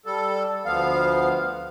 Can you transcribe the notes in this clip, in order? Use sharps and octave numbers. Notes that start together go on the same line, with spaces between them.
G3 A4
D2 F3 B3 F5